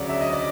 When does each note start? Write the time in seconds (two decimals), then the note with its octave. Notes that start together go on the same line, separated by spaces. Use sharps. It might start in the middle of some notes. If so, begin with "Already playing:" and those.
Already playing: D2 C#3 F#3 D5
0.09 E5
0.21 D#5
0.33 D5